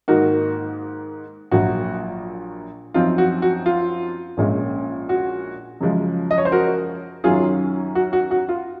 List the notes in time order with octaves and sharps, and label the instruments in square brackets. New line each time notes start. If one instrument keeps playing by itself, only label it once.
[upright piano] G#2 D#3 A#3 D#4 F#4 A#4
A#1 A#2 F#3 F#4
F#2 F3 C4 D#4 F4
F#4
F#4
F4
A#1 A#2 G#3 C#4
F#4
F#2 C#3 F3 G#3
D#5
C#5
C5
F#4 A#4
F#2 D#3 F#3 C#4 F4 G#4
F#4
F#4
F#4
F4